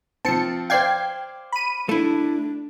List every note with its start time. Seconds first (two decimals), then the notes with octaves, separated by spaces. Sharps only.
0.25 F3 C4 A5 C#7
0.70 C5 D5 F5 G5 G#6 C7
1.52 B5 D#7
1.89 A3 D4 E4